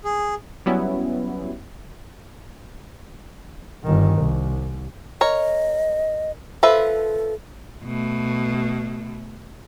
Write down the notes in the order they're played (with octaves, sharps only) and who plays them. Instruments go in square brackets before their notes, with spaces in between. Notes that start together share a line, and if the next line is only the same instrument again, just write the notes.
[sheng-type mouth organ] G#4
[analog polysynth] F#3 G3 B3 C#4 E4
[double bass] G1 D#3
C2
[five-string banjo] A#4 C#5 [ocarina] D#5
[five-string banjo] F3 B4 E5 [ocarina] A4
[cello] B2 A3